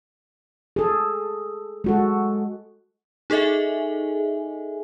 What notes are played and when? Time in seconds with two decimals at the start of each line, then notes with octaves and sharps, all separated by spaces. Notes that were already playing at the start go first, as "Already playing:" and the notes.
0.76 G#4 A4
1.84 G#3 F#4 A4
3.30 D#4 G#4 A4 D#5 E5 G#5